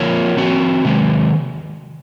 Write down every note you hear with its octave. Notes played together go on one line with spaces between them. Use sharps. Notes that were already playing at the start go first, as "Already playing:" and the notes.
Already playing: F3 A#3 F4 A#4 C#5
F3 C4 F#4
C3 D#3 G#3